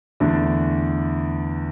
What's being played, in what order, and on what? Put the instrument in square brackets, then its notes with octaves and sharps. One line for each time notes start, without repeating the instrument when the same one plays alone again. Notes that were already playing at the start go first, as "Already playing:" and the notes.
[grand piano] E2 D3 A3 D4